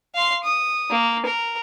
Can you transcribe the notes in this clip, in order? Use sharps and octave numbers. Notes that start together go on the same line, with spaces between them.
F5 C6
D#6
A#3
A#4